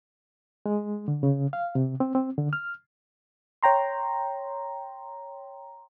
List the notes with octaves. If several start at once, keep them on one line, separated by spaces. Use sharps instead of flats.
G#3
D3
C#3
F5
C3
C4
C4
D3
F6
C#5 G5 A#5 C6